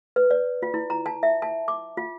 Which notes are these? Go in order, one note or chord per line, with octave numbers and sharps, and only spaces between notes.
B4
D5
F4
E4
A#5
A5
E5
A5
D6
F4